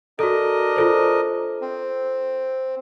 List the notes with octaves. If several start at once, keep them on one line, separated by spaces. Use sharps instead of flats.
D4 F#4 A4 A#4 D#5
F4 A4 C5
C4